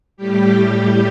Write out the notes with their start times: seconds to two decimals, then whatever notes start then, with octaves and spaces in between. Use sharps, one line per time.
0.17 A2 G3 G4
0.57 G4